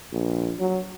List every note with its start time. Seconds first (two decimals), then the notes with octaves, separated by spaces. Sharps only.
0.12 A#1
0.59 F#3